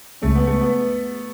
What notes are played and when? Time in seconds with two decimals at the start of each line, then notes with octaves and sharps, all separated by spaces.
0.22 C#2 C#3 G#3 A3 C#4
0.35 B3
0.47 A3
0.61 B3